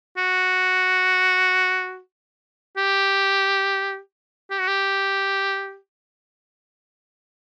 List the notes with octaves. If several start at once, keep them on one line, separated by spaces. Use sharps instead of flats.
F#4
G4
G4
F#4
G4